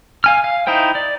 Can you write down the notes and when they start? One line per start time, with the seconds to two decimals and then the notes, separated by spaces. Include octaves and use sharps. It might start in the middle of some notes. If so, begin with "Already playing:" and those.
0.24 F5 G#5 F6
0.44 F5
0.67 D#4 E4 C5 G5
0.95 D5